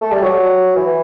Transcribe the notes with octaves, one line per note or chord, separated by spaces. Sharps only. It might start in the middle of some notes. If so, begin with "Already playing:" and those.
A3
G3
F#3
E3